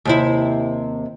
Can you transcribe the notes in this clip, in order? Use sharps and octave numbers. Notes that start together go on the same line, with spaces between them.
D#2 C3 E4